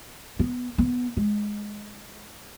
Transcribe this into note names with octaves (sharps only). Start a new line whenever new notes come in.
B3
B3
G#3